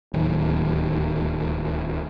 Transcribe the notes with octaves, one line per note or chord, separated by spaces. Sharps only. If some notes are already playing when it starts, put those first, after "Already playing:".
D1 D#2